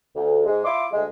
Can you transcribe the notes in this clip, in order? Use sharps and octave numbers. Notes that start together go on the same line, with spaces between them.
D2
G#2 G#3
E4 F4 C6 D6
D2 G#3